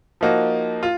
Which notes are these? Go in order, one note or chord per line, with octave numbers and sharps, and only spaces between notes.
F3 A#3 D#4 F#4
F4